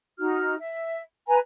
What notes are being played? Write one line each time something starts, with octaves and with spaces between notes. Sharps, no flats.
D#4 F#4 F6
E5
B4 G#5 A#5